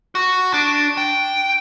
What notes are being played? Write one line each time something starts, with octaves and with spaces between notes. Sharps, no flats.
F#4
D4
G5